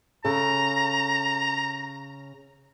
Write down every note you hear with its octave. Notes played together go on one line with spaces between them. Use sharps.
C#3 A4 A#5